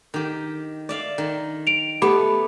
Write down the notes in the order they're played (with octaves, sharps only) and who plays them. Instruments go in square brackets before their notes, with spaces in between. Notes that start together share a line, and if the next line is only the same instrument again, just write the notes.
[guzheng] D#3 G4
D5 E5 F5
D#3
[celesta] D7 F7
[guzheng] A3 B3 [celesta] G4 B5 D6